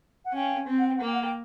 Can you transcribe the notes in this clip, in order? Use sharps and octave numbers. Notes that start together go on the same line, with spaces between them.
F#5
C#4 F5 G5
C4
F#5
G5
F#5
A#3 G5
F#5
G5